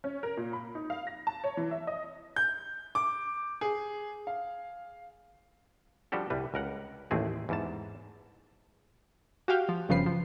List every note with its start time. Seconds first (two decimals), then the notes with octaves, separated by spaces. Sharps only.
0.04 C#4
0.23 A#4
0.37 A#2
0.53 B5
0.75 D#4
0.90 F5
1.07 A#6
1.27 A5
1.44 C#5
1.57 E3
1.71 E5
1.87 D#5
2.36 G6
2.95 D6
3.61 G#4
4.27 F5
6.12 F3 G3 D4 F#4 G4 A4
6.30 C2 G3 B4
6.54 C#2 A#4 F#5
7.11 A1 D#2 A3 C4 G#4
7.49 E2 G#2 A5
9.48 F#4 G4 F5 G5
9.69 F3
9.89 G1 C#3 F3 B4 C7
10.06 F3